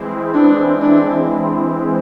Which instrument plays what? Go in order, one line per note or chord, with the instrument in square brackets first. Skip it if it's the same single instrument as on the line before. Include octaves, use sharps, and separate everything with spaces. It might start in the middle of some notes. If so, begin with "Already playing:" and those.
Already playing: [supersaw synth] E3 G#3 C4 E4
[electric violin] D4
D4